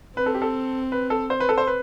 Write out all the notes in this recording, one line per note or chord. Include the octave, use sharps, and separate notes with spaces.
C4 B4
A4
G4
A4
B4
A4
C5
B4
A4
C5
B4